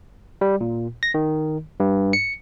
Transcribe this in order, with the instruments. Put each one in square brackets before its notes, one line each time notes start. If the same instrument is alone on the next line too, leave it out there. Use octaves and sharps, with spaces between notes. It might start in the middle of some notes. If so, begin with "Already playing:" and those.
[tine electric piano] G3
A#2
A#6
D#3
G2
C#7